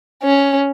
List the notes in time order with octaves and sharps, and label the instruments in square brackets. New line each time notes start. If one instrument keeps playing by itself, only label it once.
[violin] C#4